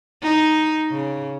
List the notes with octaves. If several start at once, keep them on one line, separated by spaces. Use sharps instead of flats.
D#4
C#3